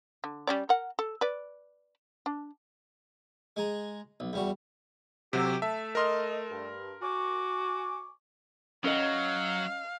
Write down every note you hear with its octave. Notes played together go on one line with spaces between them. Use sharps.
D3
G3 C#4 D5
A#4 F#5
A4
B4 D5
D4
G#3 G#4 A#5
B1
E2 G3 F#4
D2 C3 F#3 F#4 G4 E6
A3 E5 A5
A#4 D#5 C6 F6
G2
F#4 G#5 C#6 D6
F#3 C#4 A#4 D#5 F5